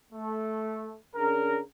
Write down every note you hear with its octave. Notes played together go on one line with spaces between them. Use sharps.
A3
C#3 D4 A#4